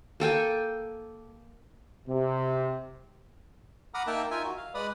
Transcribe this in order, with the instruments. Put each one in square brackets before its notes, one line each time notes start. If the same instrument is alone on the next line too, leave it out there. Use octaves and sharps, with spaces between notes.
[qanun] A#3 A4 G5 G#5
[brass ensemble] C3
[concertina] F#5 A#5 B5 D6 D#6 F6
A#3 D#4 A#4 E5 G5 A5
D#4 F4 A#4 E5 G#5
F#4
F5
G#3 B4 D5 B5 D#6